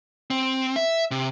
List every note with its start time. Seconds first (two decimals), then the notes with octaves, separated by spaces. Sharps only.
0.30 C4
0.76 E5
1.11 C3